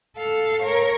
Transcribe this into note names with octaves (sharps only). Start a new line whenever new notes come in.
A4 F5
A#4 C#5